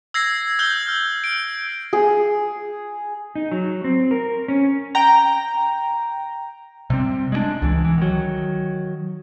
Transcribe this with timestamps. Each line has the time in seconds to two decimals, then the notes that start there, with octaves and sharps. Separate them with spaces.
0.14 E6 G#6 A#6 C7
0.59 E6 F6 G6 G7
0.88 F6
1.24 D7
1.93 G#4
3.35 D#4
3.51 F#3
3.84 C4
4.11 A#4
4.48 C#4
4.95 G5 A#5
6.90 C3 G3 C4
7.32 G#3 A#3 D4
7.62 C#2 E3
7.85 E3
7.98 D#3 F#3